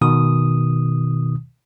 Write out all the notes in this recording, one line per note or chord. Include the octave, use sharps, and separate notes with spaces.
B2 D#3 D#6